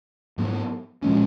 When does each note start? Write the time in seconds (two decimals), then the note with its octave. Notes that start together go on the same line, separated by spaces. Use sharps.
0.38 G#2 F#3 B3
1.02 A#2 F3 G#3 C#4